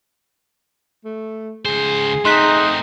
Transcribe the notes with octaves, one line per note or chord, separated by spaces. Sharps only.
A3
C#2 G#4 C5
A3 C4 D#4 C6 F#6 B6